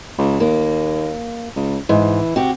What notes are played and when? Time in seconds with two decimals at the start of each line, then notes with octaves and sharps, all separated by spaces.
0.18 C#2
0.40 D#2 A#3
1.56 C#2
1.89 G#2 E3
2.36 C3 F#4 G4